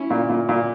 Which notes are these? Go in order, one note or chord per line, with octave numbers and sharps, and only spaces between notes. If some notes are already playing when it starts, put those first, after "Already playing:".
Already playing: C#4 E4
A#2
A#2
A#2